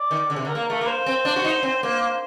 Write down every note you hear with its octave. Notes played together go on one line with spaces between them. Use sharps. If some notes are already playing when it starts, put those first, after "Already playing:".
Already playing: D5
D#3
D3
C3
D3
A#4
A#3
A3 A#4
A#3
C5
C4
D4
F#4
D#4
C4
A#3